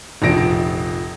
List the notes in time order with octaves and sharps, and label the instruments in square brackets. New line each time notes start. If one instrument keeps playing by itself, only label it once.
[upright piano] F1 A#1 F3 A#6 D7